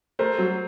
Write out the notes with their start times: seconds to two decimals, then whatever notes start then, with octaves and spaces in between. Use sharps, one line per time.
0.19 A3 A#4 C5
0.38 F#3